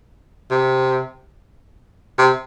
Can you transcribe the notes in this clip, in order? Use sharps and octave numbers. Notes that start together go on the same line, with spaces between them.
C3
C3